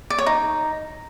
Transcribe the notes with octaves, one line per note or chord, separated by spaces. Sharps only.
D5
C#5
D#4